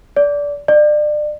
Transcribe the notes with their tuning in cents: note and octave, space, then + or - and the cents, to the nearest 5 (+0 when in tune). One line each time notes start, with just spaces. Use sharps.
D5 -20
D5 +30